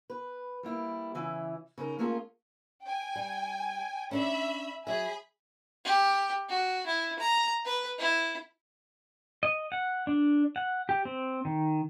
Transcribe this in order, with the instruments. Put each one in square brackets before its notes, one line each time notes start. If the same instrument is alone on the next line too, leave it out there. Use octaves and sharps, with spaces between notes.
[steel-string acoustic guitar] B4
G3 A#3 E4
C#3 E3 E4
C#3 D#4 E4 A#4 A#5
A3 A#3 C#4 F4 G#4 A#4
[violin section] G5 G#5
[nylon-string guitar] G3
[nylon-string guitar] C#4 D4 D5 [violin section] E5 B5
[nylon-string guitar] F#3 E5 [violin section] G#4 G#5 B5
[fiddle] G4
F#4
E4
A#5
B4
E4
[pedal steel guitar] D#5
F#5
D4
F#5
G4
C4
D#3